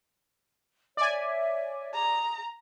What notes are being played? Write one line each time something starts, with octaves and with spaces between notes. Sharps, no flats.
C#5 D5 E5 G#5
G#4 A#5